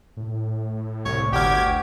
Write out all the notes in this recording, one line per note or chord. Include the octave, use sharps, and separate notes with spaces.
A2
C2 C#5
G1 D2 G4 F#5 C#6 D6 F6 G#6